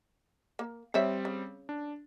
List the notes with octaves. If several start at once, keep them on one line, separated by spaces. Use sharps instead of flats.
A#3
G3 C4 C5 C#5 E5
C#3
D4